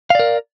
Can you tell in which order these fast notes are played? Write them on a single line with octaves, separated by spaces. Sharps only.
F5 D5 A#4